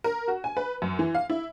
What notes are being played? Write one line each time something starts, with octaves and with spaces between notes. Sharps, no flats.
A#4
F#4
G#5
B4
F#2
E3
F5
E4